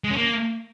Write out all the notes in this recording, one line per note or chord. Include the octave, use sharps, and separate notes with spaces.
G#3
C#4
A#3